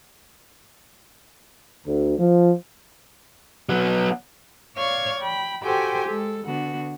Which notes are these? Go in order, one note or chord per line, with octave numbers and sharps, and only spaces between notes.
D2
F3
F#3 B3
C#5 D5 F5 C#6 F6 G#6
G5 B5
F#4 G4 A4 C5 G5 G#5
G#3 A4
D3 B3 F#4